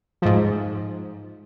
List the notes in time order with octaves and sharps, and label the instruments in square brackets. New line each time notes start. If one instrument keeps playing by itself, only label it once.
[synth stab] G#2 F3